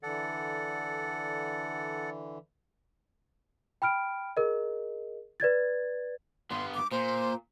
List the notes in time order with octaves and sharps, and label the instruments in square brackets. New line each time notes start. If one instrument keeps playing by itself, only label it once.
[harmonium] D3 E3 [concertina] A4 D5 F#5
[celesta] G5 B5 F6 D7
G#4 A#4 D#5
B4 D5 G#6 A6
[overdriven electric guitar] G2 B3 [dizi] C6
[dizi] D6
[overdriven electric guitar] A#2 [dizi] C5